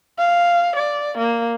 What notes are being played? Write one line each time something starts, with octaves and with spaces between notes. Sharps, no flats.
F5
D5
A#3